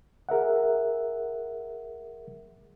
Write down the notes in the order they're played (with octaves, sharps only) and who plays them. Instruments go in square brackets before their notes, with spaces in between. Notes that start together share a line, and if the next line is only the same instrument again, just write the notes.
[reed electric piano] G#4 A#4 E5 F#5